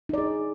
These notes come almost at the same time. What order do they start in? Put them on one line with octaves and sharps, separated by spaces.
D#4 D5 G#4